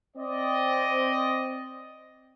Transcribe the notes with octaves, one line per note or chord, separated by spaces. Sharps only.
C4 D5 D#5